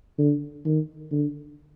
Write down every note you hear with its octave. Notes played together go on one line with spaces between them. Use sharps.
D3
D#3
D3